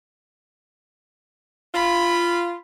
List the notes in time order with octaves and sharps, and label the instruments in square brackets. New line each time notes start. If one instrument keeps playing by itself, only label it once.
[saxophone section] F4 [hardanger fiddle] B5